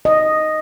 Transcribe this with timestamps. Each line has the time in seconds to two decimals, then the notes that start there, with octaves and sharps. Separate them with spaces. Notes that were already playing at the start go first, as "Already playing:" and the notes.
0.05 D#5